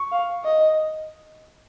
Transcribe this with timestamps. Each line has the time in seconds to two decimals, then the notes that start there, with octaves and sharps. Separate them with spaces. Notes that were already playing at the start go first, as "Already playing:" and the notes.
Already playing: C#6
0.12 F5
0.44 D#5